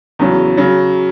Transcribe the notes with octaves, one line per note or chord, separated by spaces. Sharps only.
E2 C#3 F#3
C#3 F#3